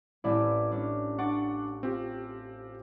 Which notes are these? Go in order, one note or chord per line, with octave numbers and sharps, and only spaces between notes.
A1 C4 E4 D5
C#4 D4
D4 F#5 C#6 D6 A6 D7
C4 F4 G4